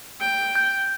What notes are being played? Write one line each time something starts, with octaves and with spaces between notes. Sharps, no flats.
G5
G6